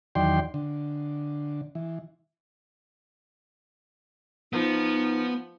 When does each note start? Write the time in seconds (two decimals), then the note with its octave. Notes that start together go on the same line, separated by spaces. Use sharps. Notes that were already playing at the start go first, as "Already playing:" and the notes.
0.15 E2 D#3 F#3 D5 G5 C6
0.54 D3
1.75 E3
4.53 F3 B3 D#4